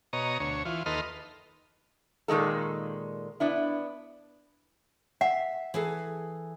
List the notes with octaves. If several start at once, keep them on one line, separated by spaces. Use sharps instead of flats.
B2 C#5 D#5 A#5
D2 C#5
E3 F4
D#2 A4 B4 D#5 C6 F6
A#2 D#3 G#3 A4
B3 D4 E4
E5 F#5
E3 G#4 A4